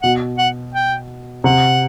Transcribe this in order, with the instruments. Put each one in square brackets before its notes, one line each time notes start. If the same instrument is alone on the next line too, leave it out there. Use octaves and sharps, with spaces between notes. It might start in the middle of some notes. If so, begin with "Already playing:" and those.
[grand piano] B2 [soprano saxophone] F#5
[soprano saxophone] F#5
G5
[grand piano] C3 [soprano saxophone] F#5